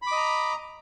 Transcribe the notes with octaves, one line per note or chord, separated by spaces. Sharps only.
D#5 A#5 B5 D6